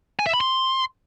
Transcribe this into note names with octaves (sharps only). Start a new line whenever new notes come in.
G#5
E5
B5
C6